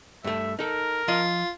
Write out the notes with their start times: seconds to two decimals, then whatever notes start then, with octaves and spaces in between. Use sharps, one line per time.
0.24 G2 A3 E5
0.59 D#4 A4 A#4
1.08 F3 F4 D#5